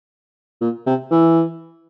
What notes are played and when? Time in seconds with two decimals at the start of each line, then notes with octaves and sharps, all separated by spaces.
0.61 A#2
0.87 C3
1.11 E3